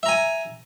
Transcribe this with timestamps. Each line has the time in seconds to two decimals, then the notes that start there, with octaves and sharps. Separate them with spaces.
0.03 E5
0.06 A#5
0.09 G#5